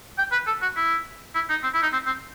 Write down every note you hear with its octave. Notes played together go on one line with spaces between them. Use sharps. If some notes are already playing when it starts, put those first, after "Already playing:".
G5
B4
A4
F#4
E4
E4
D#4
C4
E4
D#4
C4
C4